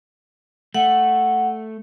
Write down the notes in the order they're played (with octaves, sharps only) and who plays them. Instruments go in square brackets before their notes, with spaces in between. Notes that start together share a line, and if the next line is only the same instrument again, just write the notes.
[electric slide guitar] A3 [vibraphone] F#5